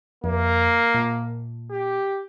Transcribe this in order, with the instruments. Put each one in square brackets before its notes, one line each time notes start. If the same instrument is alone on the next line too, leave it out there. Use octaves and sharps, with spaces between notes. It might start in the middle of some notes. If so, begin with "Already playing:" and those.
[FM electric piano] F2 [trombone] A#3
[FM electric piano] A#2
[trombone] G4